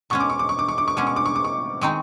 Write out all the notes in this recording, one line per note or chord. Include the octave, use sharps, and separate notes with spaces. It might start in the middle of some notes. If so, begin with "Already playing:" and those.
B2 G#3 C#4 C#6
D6
C#6
D6
C#6
D6
C#6
D6
C#6
B2 G#3 C#4 D6
C#6
D6
C#6
D6
C#6
D#3 G#3 C4 D#4 C#6